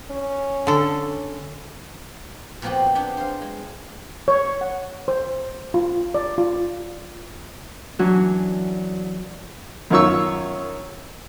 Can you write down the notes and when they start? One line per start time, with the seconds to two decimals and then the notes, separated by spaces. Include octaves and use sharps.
0.11 C#4
0.67 D3 A4
2.62 A#2 F3 B3 C4 F#4 G4
2.95 B3 D4 G4 G#4
3.17 C5 F5
3.42 G#3
4.28 C#5
4.61 F#5
5.08 C5
5.74 F4
6.15 D5
6.38 F4
7.99 E3 F#3 C#4 D4 F#4
9.90 F#2 D#3 F4 C#5 C#6 E6